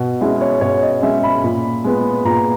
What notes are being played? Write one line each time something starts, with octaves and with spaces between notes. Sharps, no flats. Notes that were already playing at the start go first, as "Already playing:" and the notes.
Already playing: B2
G#3 C#4 E4
C#5
B2 C#5
D#5
G#3 C#4 E5
B5
A#2
G#3 B3
A#2 A#5